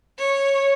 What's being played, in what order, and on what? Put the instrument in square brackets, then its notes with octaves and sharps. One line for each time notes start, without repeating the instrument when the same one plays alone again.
[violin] C#5